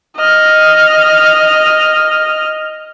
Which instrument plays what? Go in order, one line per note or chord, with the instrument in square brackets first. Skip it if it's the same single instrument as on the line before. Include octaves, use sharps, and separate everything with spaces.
[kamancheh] D#5 F6